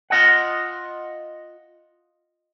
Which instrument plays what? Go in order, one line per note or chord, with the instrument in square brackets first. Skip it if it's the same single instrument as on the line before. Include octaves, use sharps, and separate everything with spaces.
[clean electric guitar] F4 D#5 F#5